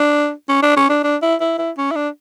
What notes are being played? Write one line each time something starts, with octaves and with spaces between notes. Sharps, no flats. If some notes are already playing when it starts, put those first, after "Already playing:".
Already playing: D4
C#4
D4
C#4
D4
D4
E4
E4
E4
C#4
E4
D4